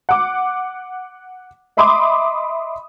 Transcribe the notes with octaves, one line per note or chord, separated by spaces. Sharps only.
F#5 D6
D#5 E5 B5 C6 D6 D#6